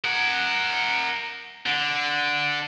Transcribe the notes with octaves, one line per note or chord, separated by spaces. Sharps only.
A#4 F#5
D3